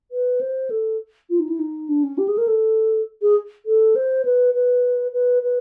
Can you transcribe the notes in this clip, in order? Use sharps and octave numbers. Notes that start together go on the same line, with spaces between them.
B4
C5
A4
F4
D#4
E4
D#4
D4
C#4
G4
G#4
A#4
A4
G#4
A4
C5
B4
B4
B4
B4